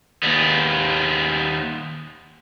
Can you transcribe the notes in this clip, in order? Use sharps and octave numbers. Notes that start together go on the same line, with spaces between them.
D#2 B3